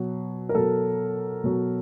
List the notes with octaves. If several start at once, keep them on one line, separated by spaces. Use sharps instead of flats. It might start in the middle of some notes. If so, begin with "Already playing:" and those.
Already playing: B2 F#3
A#4
B2 F#3 A4
B2 F#3